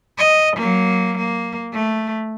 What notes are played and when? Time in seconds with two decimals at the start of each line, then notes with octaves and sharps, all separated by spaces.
0.18 D#5
0.57 F#3 A#3
1.18 A#3
1.73 A3